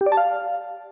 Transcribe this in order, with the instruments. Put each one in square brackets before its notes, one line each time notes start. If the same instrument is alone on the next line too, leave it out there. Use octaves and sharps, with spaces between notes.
[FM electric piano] G4
D5
A5
F5